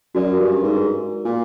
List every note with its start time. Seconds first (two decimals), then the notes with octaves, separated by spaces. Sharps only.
0.15 F#2 F#4 A#4 D5
0.40 G2
0.63 G#2
1.25 A#2